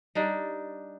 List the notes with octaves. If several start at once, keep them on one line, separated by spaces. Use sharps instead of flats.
G3 D4 D#4